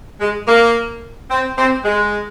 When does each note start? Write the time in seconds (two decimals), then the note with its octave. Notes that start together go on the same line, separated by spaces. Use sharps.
0.21 G#3
0.48 A#3
1.31 C4
1.58 C4
1.85 G#3